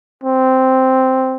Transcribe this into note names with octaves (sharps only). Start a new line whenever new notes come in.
C4